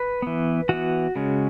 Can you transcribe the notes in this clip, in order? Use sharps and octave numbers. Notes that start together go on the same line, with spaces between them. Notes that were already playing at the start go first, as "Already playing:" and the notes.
Already playing: B4
E3 B3
E3 B3 F#4
C#3 G#3 C#4